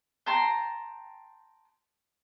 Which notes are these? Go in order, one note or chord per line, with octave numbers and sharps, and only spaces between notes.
G5 A5 A#5 C6